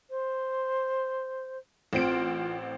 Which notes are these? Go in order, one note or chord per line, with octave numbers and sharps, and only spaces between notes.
C5
A1 C4 F4 D7